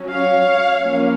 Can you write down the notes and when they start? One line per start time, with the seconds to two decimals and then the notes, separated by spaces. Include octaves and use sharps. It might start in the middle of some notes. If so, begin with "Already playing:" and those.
Already playing: F#3 C#4
0.12 C#5 F5
0.81 F3 A#3 C#4